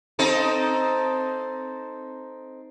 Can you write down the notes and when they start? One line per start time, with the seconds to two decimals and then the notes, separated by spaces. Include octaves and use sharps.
0.19 C4 D#4 A4